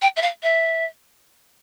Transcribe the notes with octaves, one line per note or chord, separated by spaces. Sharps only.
G5
E5
F5
E5